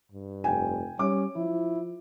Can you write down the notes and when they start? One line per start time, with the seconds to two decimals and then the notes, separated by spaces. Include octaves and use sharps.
0.12 G2
0.44 F1 G5 G#5
0.99 G3 C#4 D6
1.36 F3 E4